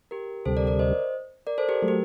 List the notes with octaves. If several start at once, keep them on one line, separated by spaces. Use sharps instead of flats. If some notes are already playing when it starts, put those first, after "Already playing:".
G4 A#4
D2 C3 G3 A4 C5
A#4 D5
A#4 D5
C5 D#5
A#4 D5
A4 C5
G4 A#4
F#3 A3
G4